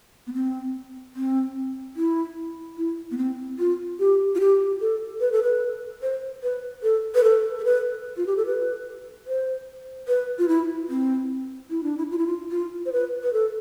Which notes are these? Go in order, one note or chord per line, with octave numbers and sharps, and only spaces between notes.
B3
C4
C4
E4
E4
B3
C4
F4
G4
F4
G4
A4
B4
A4
B4
C5
B4
A4
B4
A4
A4
B4
F4
G4
A4
B4
C5
B4
F4
E4
C4
E4
D4
E4
F4
E4
F4
F4
C5
B4
B4
A4